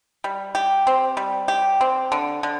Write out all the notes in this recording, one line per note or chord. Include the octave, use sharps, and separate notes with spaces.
G3
G4
C4
G3
G4
C4
D3
D3